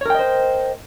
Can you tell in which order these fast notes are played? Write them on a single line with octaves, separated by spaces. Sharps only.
C#5 A#4 G5 D#5 C5